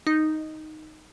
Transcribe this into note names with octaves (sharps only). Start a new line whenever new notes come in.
D#4